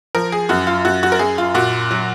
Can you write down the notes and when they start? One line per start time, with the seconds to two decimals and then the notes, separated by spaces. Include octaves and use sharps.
0.15 F3 A#4
0.32 G#4
0.49 F#2 F#4
0.67 F4
0.85 F#2 F#4
1.03 F#4
1.12 A#4
1.19 F#2 G#4
1.38 F4
1.54 A#2 F#4
1.91 F#3